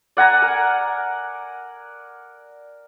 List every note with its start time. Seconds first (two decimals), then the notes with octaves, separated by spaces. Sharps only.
0.17 D5 F#5 G#5 A#5
0.42 A#4